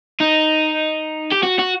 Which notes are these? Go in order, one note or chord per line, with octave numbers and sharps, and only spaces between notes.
D#4
G4
F#4
F#4